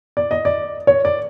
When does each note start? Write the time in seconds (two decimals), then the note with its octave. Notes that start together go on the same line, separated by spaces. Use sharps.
0.17 D5
0.31 D#5
0.45 D5
0.87 C#5
1.05 D5